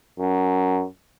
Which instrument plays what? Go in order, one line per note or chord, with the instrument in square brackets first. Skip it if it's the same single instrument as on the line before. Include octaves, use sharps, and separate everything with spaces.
[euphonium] F#2